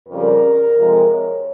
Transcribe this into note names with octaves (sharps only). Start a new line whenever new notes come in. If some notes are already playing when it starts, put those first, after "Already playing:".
F2 C#3 G3 A#4
F2 C3 F3 G#3
C#5